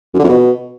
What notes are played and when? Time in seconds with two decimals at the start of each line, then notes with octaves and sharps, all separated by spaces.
0.14 F#2
0.19 D3
0.24 F2
0.29 B2